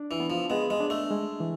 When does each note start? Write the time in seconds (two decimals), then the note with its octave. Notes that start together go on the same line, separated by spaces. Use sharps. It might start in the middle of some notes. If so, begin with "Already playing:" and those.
Already playing: D4
0.11 E3
0.20 B3
0.30 F3
0.50 G#3 B3
0.70 G#3
0.80 D4
0.90 A3
1.11 G#3
1.40 E3